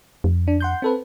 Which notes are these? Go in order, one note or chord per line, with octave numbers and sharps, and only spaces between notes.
F2
D4
F#5 C6 G6
C4 A4 B4